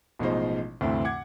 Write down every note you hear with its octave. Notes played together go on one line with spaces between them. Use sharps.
A1 B2 F3 G#3 D#4 C5
D2 G2 C3 E3 A3 C4
F#5 D6 G#6